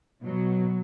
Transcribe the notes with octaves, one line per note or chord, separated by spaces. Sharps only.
B2 F#3